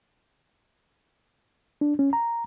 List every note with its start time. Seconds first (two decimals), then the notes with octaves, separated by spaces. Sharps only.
1.81 D4
1.99 C#4
2.13 A#5